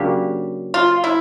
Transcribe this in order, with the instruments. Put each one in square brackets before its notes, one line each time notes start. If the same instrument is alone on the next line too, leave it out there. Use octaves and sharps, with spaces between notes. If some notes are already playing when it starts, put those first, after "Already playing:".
Already playing: [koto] C#3 F#3 A#3 D4 G4
[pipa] F4
E4